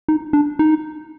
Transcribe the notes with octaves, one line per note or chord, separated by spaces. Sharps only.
D#4
D4
D#4